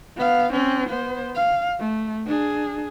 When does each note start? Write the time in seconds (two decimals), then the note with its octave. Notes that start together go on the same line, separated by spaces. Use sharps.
0.16 B3 F5
0.53 C4 C#4
0.90 B3 C5
1.35 F5
1.79 A3
2.26 D4 G#4